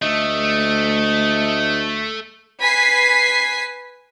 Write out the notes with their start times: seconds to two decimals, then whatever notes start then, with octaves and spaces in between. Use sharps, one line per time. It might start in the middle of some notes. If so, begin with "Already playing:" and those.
0.02 D2 A3 D#5
2.61 B4 G#5 B6 C7